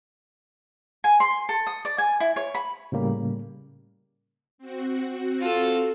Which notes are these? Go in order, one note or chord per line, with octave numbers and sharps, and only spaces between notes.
G#5
C6
A4
D#6
D5
G#5
E4
C#5
B5
A2 C#3 G3 A#3
C4 F#4
F4 A4